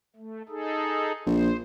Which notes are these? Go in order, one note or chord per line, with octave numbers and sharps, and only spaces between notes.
A3
D#4 G#4 A4
A#1 C5